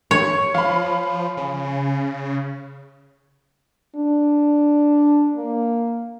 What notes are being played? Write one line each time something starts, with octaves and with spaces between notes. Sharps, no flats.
C#5
F3 F5 B5
C#3
D4
A#3